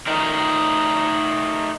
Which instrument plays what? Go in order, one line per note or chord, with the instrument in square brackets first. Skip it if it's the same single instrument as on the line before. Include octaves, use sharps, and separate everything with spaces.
[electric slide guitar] A3 D#4 A#4